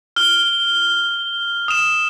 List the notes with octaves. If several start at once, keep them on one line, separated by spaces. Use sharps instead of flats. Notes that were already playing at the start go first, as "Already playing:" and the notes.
F6 G7
D#6 E7